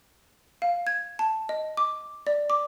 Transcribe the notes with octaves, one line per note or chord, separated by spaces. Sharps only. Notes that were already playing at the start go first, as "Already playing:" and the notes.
F5
G#6
A5
D#5
D6
D5
D6